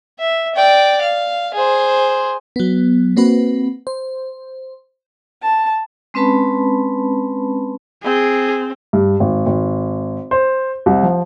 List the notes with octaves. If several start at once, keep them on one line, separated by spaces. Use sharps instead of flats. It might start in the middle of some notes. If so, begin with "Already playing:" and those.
E5
D5 G5
F5
G#4 C5
F#3 B3
A#3 C4 F#4 B4
C5
A5
G#3 C4 C#4 B4 A5 B5
C4 G#4
G2
G#1
G#1
C5
C2
F3